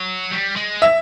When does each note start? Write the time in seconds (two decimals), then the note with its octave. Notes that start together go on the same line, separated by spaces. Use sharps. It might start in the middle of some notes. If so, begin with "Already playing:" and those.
Already playing: F#3
0.31 G3
0.56 G#3
0.82 E5